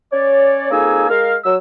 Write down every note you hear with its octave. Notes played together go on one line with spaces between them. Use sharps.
C#4 C#5 D5
F2 A#3 D#4 G#4 G#5 E6
G#3 A#4 F5
F#3 E6